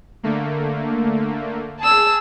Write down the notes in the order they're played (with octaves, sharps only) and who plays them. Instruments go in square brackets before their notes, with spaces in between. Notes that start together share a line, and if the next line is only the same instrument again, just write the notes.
[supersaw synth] D3 A3 A#3
[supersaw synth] G#4 [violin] A5 E6